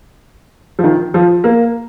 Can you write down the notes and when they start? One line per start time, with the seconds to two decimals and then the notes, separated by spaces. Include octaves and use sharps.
0.79 F3
0.84 D#3
1.14 F3
1.44 A#3